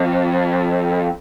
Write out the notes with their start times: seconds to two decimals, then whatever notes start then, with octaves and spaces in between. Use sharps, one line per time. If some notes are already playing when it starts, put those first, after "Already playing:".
Already playing: F2